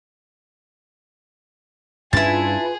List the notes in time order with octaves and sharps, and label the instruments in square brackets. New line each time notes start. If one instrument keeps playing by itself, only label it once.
[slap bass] G2 C#4 D4 [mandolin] E4 A5 [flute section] F4 B4 [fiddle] G#4